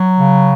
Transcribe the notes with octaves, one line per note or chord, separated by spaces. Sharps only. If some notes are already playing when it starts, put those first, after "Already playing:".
Already playing: F#3
C#3